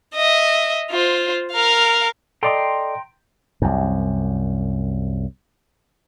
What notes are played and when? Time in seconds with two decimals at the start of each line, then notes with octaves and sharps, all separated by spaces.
0.15 D#5 E5
0.91 F4 C5
1.53 A#4 F5
2.43 A4 D5 D#5 G5 A#5 C6
3.62 C2 F#2